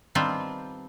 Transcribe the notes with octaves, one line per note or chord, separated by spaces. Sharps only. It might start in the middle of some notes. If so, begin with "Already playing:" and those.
D#3 G3 B3 C4 D4 F4